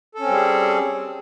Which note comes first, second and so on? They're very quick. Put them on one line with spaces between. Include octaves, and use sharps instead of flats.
A4 C#4 C4 G3 G#4